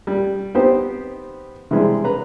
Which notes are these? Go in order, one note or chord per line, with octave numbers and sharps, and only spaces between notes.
G3
B3 C4 D#4 G4 C5
C3 E3 G3 G#3
B4 A#5